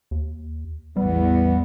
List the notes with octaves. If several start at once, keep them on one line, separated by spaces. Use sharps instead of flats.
D#2
A1 E2 G3 B3